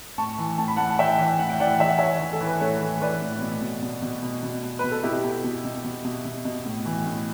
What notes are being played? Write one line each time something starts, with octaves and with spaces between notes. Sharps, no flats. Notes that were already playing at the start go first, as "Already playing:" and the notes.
A2 A5 C#6
E3
A2 A5
B5
A2 F#5 A5
A5
E3 E5 G5
E3
A2 F#5
G5
E3 D5 F#5
E3 E5
F#5
E3 C#5 E5
E3
A4
E3
B4
A2 A4 C#5
E3
E3 B4 D5
A2
B2
B2
B2
B2
B2
B2
B2
B2 B4
A4
B2 E4 G4
B2
B2
B2
B2
B2
B2
B2
A2
E3
A2